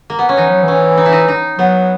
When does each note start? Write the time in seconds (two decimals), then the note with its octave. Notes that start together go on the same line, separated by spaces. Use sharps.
0.10 A#3
0.19 B3
0.29 C#4
0.37 E3 D#4
0.50 F#3
0.63 E3
0.68 C#4
0.97 D#4
1.06 E4
1.13 D#4
1.28 D#4
1.58 F#3 B3